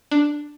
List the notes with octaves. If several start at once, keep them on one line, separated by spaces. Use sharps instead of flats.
D4